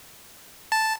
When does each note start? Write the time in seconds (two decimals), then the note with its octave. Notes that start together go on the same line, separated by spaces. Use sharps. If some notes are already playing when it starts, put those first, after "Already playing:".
0.72 A5